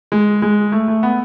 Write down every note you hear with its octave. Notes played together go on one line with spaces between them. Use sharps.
G#3
G#3
A3
A3
B3